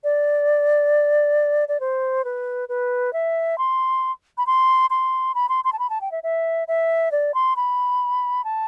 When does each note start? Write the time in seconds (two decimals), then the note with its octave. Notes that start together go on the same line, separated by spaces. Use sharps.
0.04 D5
1.68 D5
1.80 C5
2.25 B4
2.69 B4
3.13 E5
3.58 C6
4.38 B5
4.47 C6
4.90 C6
5.35 B5
5.49 C6
5.64 C6
5.73 A5
5.79 B5
5.90 A5
6.01 G5
6.12 E5
6.23 E5
6.68 E5
7.12 D5
7.34 C6
7.56 B5
8.44 A5